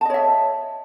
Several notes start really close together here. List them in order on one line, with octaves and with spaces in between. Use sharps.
A5 D#5 C#5 E5